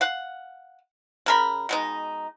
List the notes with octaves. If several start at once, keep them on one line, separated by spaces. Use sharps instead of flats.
F5 F#5
C#3 A#4 B5
B2 G#3 D#4